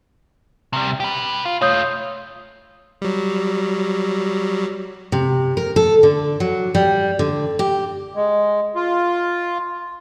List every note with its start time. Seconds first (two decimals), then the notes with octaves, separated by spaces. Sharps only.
0.73 C3 G3
1.00 G4 B4
1.45 F4
1.61 A3 F4 C#5 D#6 G6
3.02 F#3 G3
5.12 C3
5.57 A#4
5.76 A4
6.03 D3
6.40 F#3
6.75 G3
7.19 D3
7.59 G4
8.16 G#3
8.75 F4